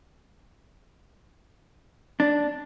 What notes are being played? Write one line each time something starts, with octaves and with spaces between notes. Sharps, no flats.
D4